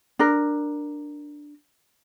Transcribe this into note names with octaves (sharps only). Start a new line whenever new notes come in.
D4 A#4